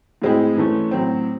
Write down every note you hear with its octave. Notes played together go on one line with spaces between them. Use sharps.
A2 G#3 C4 E4 G#4
G#2 E3 A3 C#4
A2 F#3 C4